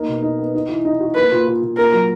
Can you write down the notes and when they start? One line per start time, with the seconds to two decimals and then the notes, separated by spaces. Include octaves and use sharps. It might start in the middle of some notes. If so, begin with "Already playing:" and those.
Already playing: A#3 D#4
0.08 B2
0.22 D#4
0.39 B3
0.54 D#4
0.69 E3
0.85 D#4
1.00 F#4
1.15 A#3 B4
1.32 A#2
1.47 A#2
1.62 A#2
1.77 A#3 A#4
1.93 F#3